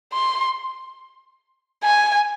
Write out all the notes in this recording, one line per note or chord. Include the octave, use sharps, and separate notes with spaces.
C6
G#5